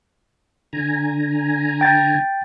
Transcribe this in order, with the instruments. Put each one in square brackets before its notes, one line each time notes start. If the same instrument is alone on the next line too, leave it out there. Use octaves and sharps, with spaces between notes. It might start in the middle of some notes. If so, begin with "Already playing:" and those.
[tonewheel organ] D3 G#5 A#5
[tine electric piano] G5 A6